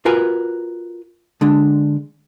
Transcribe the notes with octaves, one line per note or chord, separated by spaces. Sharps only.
F4 F#4 A#4 B4 G#5
D3 G#3 D4